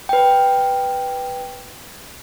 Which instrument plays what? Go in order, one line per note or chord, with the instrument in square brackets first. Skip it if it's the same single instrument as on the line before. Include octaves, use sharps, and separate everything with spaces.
[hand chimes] B4 G5